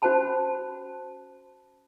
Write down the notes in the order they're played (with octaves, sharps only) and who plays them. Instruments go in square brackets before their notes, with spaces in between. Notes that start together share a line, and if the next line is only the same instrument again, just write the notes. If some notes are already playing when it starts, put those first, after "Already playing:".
[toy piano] C#4 F#4 C5 C#5 A5 B5